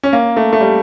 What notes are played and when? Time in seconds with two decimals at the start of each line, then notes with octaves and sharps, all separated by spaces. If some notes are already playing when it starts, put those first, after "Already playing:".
0.03 C#4
0.13 A#3
0.37 A3
0.53 A3
0.60 G3